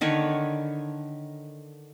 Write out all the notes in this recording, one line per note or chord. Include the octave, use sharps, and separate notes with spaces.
D3 D#3 B4 C#5